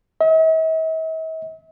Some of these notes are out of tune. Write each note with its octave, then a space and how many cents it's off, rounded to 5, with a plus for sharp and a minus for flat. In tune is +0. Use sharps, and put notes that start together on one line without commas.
E5 -45